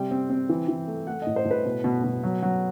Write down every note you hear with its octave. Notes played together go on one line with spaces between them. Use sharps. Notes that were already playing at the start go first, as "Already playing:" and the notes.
Already playing: C3 G3 G5
C4
C4
E3
E3
A3
A3 F#5
A2 D#5
C5
A2
B4
B2
B2
B2
F#3
F#3